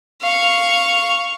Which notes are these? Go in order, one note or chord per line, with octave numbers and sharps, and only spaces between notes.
F5 C#6